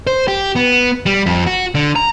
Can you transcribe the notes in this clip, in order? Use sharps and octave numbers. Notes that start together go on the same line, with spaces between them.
C5
G4
B3
G3
F2
F#4
D3
A#5